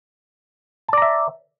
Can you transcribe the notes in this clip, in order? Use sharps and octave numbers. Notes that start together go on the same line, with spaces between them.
D5 E5 A5 A#5